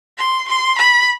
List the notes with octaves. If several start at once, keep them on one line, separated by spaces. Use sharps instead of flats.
C6
C6
B5